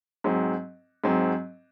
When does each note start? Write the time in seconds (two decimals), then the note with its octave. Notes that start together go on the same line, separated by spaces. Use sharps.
0.24 G#2 F#3 C4
1.04 G#2 F#3 C4